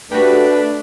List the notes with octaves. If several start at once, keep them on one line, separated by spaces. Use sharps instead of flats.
A3 D4 F#4 G4 B4